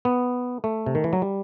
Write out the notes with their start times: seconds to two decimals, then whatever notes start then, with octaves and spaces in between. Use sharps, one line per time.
0.05 B3
0.64 A3
0.86 C3
0.95 D#3
1.04 E3
1.13 F#3
1.22 G3